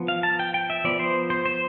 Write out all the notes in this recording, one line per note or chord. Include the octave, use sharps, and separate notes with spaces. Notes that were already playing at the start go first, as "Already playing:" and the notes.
Already playing: F3 B3
F5
A5
G5
G5
E5
F3 B3 D5
C5
C5
C5